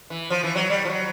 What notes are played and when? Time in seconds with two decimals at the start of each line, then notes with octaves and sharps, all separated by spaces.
0.10 E3
0.30 F3
0.43 E3
0.55 F#3
0.70 G3
0.85 F3
0.90 F#3